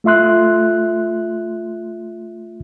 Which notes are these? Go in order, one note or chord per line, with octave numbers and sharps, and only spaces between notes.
A3 F4 E5 C6 F#6